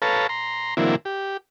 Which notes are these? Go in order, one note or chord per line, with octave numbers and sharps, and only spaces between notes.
A4 B4 C#5 F5 A5 A#5
A#5 C6
D3 E3 F#3 A#3 C4 E4
G4